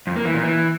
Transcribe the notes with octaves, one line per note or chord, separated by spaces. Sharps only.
F2
A#3
E3
A#2
E3